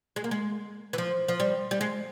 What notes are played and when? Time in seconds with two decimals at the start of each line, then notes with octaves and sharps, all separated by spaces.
0.16 G#3
0.24 A#3
0.31 G#3
0.93 E3
0.98 F3
1.28 F3
1.40 G3
1.71 G3
1.81 G#3